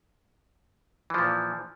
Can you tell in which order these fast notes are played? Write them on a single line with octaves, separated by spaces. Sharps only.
E3 F3 A#2